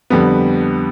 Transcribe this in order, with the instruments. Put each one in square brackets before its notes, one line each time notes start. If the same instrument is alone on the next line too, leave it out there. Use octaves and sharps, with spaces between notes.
[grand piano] F2 D3 G3 B3